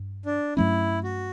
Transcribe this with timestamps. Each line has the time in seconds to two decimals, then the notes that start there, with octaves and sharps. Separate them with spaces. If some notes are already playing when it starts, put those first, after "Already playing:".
Already playing: G2
0.25 D4
0.57 G2 F#3 A3 C#4 E4
1.04 F#4